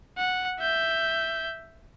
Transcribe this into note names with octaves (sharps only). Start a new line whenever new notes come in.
F#5
E5 G6